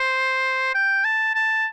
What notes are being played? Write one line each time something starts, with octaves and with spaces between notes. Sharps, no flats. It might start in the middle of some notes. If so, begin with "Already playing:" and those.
Already playing: C5
G5
A5
A5